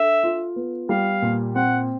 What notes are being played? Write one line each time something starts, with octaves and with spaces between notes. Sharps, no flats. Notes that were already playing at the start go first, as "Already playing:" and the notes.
Already playing: D4 A4 E5
F4
B3
G3 F5
A#2
C4 F#5